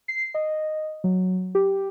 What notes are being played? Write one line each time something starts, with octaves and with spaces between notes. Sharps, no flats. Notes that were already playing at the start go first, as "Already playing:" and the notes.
C7
D#5
F#3
G4